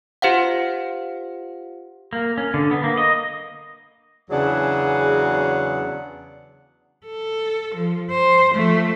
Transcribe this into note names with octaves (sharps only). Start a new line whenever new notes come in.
F4 G4 C5 F5 F#5
A#3
C#4
D3
B3
A#3
D#5
E2 C#3 F#3 D4 G#4 F#5
A4
F3
C5
F3 A3